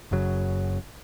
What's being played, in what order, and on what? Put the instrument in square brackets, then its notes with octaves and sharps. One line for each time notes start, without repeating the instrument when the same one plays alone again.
[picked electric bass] F#1 F#2 C#3 F#3